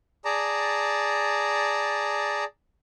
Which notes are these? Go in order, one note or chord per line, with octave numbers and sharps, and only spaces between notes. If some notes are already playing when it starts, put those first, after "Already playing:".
G#4 D5 A5 A#5